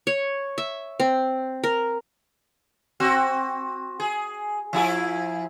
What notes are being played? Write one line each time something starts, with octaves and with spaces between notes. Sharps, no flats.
C#5
E5
C4
A#4
C4 F#4
G#4
F3 E4 G#4